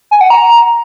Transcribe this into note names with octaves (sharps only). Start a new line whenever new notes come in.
G#5
F#5
A#5